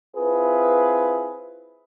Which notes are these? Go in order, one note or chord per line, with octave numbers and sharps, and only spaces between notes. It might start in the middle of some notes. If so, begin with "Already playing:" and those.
C4 E4 F4 G#4 B4